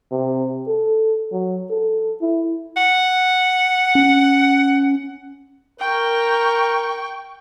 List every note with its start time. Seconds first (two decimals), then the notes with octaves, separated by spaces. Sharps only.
0.11 C3
0.67 A4
1.32 F#3
1.70 A4
2.21 E4
2.76 F#5
3.95 C#4
5.80 A#4 G5 C#6